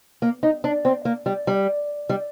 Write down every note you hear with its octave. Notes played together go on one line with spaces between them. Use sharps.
A#3
D#4
D4
C4
A#3
G3
G3
G3